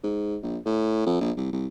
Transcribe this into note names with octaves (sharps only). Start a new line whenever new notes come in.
G#2
A#1
A2
F2
A#1
C2
C2